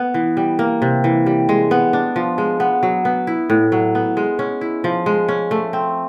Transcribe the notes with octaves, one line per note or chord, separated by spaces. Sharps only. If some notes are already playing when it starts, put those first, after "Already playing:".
Already playing: B3
E3
G3
A#3
C3
E3
G3
G#3
B3
D4
F3
G#3
B3
F#3
B3
E4
A2
F#3
B3
G#3
C#4
E4
F3
G#3
C#4
A3
C4